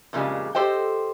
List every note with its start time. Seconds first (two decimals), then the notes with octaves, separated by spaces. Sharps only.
0.13 F2 A#2 C#3 G3 G#3
0.55 G4 A4 C5 D#5 G5